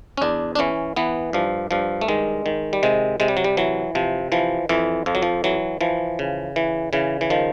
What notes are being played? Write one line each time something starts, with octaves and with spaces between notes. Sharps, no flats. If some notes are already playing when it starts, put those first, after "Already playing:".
C#4
E2 D4
D4
E3 C#4
E3 B3
G2 F3
G2 F3
A3
D#3 G#3
D#3
G3
C3 G#3
C3 G#3
G3
F#3
G3
E3 F#3
C3 F3
E3 F3
F2 E3
F2 F3
F#3
F3
E3 F#3
E3 F3
C#3
E3
C#3 E3
E3
D#3 F3